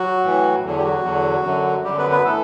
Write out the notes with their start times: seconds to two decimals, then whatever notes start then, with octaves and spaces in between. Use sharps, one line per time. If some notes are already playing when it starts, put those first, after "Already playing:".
Already playing: F#3 F#4
0.23 A2 E3
0.63 E2 D3 F#3
0.78 G4
0.84 F#3 F#4
1.03 E2 D3 F#3
1.44 F#2 D3 F#3
1.85 F#2 D3 F#3 G3 G4
1.98 B3 B4
2.11 B3 B4
2.25 E3 A3 A4